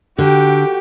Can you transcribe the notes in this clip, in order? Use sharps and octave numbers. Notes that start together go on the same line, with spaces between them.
D3 F#4 G4 G5